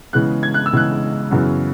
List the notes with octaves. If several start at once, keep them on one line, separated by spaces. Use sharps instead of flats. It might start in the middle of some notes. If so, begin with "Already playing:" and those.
C#3 E3 G#3 B3 F#6
G#6
F#6
E6
C#3 E3 G#3 B3 F#6
F#2 C#3 E3 B3